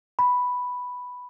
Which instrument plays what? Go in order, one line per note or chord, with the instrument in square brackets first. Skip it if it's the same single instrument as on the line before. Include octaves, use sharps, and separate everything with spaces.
[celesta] B5